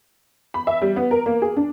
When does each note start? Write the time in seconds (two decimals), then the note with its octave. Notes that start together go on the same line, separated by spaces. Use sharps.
0.54 B5
0.67 E5
0.82 G3
0.96 B3
1.11 A#4
1.26 A#3
1.42 G#4
1.57 D4